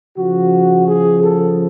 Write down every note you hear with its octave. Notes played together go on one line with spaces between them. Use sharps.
C#3 F3 F#4
G#4
A4